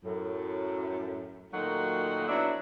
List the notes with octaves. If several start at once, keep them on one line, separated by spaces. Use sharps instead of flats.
F#2 A2
A#2 D#3 F#3 A3 D#4 F#4
F#3 B3 D4 E4 C#5 E5